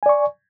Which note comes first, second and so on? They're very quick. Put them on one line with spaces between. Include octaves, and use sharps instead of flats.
G#5 D5 C#6